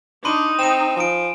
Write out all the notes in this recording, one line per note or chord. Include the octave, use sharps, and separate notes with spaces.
D4 D#4 B5 C6 D#7
C4 D#7 E7
F3 G#5 D7